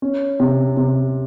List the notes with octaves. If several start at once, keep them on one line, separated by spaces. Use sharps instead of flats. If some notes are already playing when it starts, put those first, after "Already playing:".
C#4
C3
C3